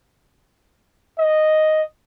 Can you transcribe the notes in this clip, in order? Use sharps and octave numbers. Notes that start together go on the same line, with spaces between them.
D#5